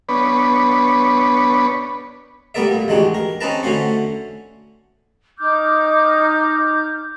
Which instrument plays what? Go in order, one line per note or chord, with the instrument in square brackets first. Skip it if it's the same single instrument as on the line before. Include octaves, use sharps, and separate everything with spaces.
[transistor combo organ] B3 D4 B4 C#5
[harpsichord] G3 A3 B3 A#4 D5 E5
A#2
A1 D#3 G#3 D4 F#4 G4
A#4
C4 C#4 D#4 B4 A5 A#5
D3 A3 C#4 F#4 C5 C#6
[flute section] D#4 D6 F6 G6